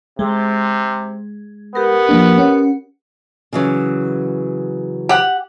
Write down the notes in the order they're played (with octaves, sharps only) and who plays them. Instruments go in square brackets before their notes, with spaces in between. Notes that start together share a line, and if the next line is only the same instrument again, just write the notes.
[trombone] C3 [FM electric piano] G#3
[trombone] B3 [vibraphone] G4 A#4
[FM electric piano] F3 A#3 D4
C#4 F#5
[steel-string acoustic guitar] C#3 E3 F#3
[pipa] G4 F#5